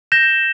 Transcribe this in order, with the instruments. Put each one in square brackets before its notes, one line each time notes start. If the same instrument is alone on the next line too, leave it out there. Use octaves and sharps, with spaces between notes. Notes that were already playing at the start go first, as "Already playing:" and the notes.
[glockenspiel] G6 A#6 E7 G7